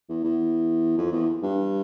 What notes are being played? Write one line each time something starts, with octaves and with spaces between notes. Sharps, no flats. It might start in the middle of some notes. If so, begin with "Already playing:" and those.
E2
E2
F2
E2
G2